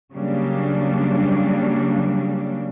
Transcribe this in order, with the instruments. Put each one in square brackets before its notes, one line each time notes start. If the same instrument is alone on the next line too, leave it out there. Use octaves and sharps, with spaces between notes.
[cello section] C#3 F#3 G3 A#3 D4